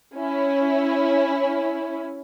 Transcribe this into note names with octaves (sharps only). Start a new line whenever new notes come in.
C#4 E4